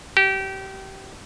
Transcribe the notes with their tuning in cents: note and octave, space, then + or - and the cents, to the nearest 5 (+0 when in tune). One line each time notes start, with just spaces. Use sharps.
G4 -25